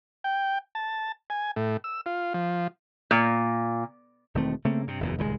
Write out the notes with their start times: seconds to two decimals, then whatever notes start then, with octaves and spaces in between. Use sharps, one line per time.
0.24 G5
0.75 A5
1.30 G#5
1.56 A2
1.84 E6
2.06 F4
2.34 F3
3.11 A#2
4.35 E1 D#3 A3 C4
4.65 C#3 A3 A#3 C4
4.87 G2 C3
5.00 F#1 E2 A#2
5.18 D#1 C#2 C3 G#3